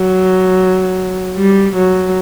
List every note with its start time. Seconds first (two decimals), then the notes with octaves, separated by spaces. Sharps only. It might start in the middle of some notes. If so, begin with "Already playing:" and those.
Already playing: F#3
1.37 G3
1.76 F#3